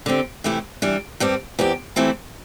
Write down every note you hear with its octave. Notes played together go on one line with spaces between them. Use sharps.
D3 C4 G4
C3 E3 A3 E4 G4
E3 G3 D4
G2 G3 C4 G4
E2 E3 C4 G4
E3 A3 C4 E4 G4